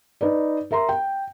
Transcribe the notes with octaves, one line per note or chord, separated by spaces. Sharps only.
D#4 B4 D5
A#4 E5 A#5 C6
G5